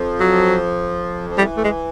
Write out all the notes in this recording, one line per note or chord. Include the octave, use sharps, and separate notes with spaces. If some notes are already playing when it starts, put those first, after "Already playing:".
Already playing: F2 F3
F#3
F3
E3 G3
A3
G#3